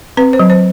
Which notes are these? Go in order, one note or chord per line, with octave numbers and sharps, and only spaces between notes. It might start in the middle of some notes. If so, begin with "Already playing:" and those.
C4 B4
C5
F#3
C5